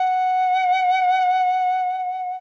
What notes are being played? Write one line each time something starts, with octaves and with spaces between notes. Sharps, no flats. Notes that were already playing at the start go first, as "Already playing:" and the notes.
Already playing: F#5